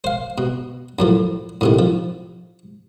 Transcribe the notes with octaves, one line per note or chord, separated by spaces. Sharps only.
C5 F5
B2
F#2 A2 F3
A2 C3 D#3
F3